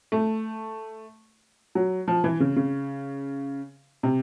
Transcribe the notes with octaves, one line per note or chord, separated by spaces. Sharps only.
A3
F#3
F3
E3
C#3
C#3
C3